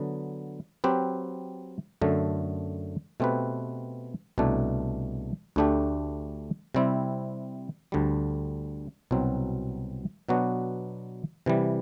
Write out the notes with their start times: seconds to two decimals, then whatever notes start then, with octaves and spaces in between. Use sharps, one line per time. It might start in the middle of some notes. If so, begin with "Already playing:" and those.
Already playing: D3 F#3 B3
0.84 F#3 C4 G4 B4
2.02 F#2 D3 A3
3.20 B2 A3 C4 G4 B4
4.38 C2 B2 A3 D4
5.56 D2 D3 A3 D4 G4
6.75 C3 G3 C4 E4
7.92 D2 D3 G3
9.11 C2 B2 F#3 C4
10.29 B2 F#3 B3 D4 F#4
11.46 C3 E3 G3